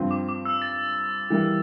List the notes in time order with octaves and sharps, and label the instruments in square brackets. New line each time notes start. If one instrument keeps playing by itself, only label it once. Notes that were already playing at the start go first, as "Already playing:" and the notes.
Already playing: [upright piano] G2 F3 C4
[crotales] D6
D6
E6
A6
[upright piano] E3 G3 A#3